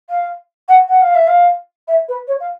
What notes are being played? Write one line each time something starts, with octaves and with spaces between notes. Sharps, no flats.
F5
F#5
F#5
F5
E5
F5
E5
B4
C#5
F5